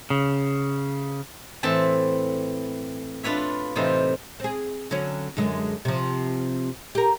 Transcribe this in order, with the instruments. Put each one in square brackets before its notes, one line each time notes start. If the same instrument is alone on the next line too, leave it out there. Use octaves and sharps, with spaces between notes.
[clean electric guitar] C#3
[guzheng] A2 E3 C4 E5 A5
D4 F4 B4 C#5 E5
A2 C3 E3 D#4 F4 C5
[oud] C4 G#4
D3 F#3 C#4
F#2 D3 G#3
C3 F3
G4 A#4